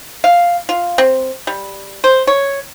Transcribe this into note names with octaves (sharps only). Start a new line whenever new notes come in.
F5
F4
C4
G3
C5
C#5